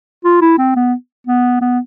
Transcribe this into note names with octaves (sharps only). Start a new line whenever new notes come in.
F4
E4
C4
B3
B3
B3